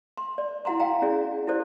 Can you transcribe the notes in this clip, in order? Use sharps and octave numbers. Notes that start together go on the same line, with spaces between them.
C6
D5
E4 F#4 F#5 A#5 C6
F5 G5 A#5
C#4 E4 F#4 G#4 D5
E4 G4 A4 C5 D5